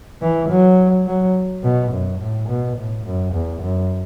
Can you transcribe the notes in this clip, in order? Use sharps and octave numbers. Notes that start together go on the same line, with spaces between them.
E3
F#3
F#3
B2
F#2
A2
B2
A2
F#2
E2
F#2